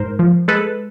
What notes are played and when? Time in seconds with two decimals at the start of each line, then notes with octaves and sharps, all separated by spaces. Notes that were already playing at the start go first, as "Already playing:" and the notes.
Already playing: G#2 A#4 C5
0.19 F3
0.48 G#3 A4 B4